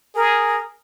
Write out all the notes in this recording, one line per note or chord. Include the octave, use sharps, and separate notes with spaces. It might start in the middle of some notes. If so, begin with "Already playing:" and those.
G#4 A#4